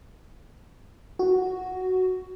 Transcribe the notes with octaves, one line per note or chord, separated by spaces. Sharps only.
F#4